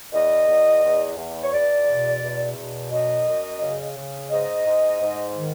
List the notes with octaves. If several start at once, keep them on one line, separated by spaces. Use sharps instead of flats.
E2 D#5
E2
E2
E2
C#5
E2 D5
B2
E2
B2
F#2 D#5
F#2
C#3
C#3
G#2 D#5
G#2
G#2
D#3